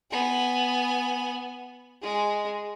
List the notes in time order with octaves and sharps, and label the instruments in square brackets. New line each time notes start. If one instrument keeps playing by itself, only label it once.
[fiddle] B3 G#5
G#3 G#4